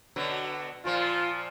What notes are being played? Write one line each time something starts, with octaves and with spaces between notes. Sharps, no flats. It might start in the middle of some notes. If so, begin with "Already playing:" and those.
B2 D3 F#3
A#2 F3 F4